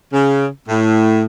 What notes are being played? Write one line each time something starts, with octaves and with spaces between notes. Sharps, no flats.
C#3
A2